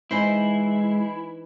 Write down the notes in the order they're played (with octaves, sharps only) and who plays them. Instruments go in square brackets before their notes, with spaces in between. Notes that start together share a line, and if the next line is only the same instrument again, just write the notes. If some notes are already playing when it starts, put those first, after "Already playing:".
[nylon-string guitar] E3 D#4 C5 [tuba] G#3 [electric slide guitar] E4 [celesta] D#5 G#5 C7